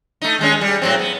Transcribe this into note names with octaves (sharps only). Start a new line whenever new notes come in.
A3 D#4
D#2 G#3 C#4
G3
A2 F#3 C4
B3